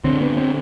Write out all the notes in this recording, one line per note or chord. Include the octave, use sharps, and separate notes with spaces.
D3 C4
B3
C4